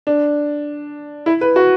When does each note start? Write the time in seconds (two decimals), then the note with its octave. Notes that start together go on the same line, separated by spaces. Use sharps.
0.07 D4
1.26 E4
1.41 B4
1.56 F#4